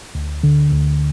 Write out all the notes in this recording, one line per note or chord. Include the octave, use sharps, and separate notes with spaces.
D2
D3
D2